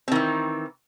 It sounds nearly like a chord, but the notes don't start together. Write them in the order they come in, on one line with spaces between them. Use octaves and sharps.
C4 D#3 E3